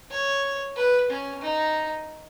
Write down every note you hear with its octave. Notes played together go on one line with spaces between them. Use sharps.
C#5
B4
C#4
D#4